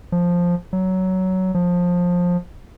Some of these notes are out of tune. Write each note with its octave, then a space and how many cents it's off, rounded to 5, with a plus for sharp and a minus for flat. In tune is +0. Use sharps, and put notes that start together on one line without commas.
F3 +5
F#3 +15
F3 +20